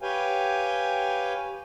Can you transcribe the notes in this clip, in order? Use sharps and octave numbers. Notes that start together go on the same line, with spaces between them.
G4 B4 C#5 F5 G5 G#5